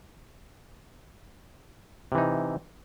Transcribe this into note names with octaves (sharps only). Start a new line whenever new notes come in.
C3 E3 D#4